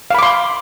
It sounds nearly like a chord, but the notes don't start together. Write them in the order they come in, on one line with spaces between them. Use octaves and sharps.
F5 B5 D6 C6